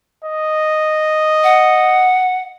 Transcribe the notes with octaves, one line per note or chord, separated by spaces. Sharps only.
D#5
F#5